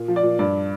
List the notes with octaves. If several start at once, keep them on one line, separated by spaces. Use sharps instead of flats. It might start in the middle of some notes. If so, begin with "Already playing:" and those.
Already playing: A#2
F3
D5
A#2
G2 D5